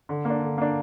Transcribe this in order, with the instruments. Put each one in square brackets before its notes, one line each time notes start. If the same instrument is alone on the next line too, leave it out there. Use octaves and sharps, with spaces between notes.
[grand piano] D3
A#3 D4
D3
A#3 D4